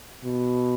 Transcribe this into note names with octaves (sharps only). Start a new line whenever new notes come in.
B2